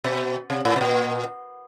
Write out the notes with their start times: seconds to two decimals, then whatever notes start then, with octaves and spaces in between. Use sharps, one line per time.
0.04 B2
0.50 C3
0.65 A2
0.76 B2
0.81 A#2